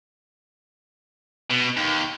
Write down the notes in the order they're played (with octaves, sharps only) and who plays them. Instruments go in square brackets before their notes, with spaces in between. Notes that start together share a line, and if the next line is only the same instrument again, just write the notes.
[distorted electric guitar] B2
D#2